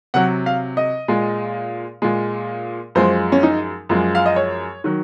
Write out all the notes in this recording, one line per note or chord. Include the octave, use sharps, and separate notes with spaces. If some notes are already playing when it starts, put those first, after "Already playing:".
C3 F#3 F#5
F5
D#5
A#2 G#3
A#2 G#3
F#2 F3 G#3 C5
C#4
D#4
F#2 F3 G#3
F5
D#5
C#5
D#3 F#3